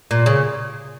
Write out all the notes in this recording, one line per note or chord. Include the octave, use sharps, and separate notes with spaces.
A#2
C#3